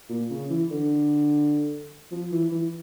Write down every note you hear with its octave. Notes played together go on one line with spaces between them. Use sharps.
A#2
C#3
E3
D3
F3
E3
E3